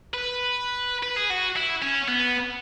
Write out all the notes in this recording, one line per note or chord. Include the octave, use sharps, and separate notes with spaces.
B4
B4
G#4
F#4
E4
C#4
B3